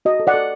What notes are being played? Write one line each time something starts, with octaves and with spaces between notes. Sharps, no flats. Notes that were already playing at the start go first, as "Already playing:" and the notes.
F#4 D#5
A4
D5 F#5
A4